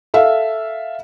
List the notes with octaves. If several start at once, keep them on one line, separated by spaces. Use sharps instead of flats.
A4 E5 F5